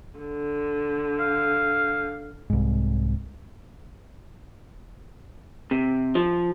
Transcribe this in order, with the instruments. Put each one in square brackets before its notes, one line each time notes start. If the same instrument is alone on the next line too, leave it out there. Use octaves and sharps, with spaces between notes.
[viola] D3
[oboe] F5
[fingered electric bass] C2 G#2
[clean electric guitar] C3
F3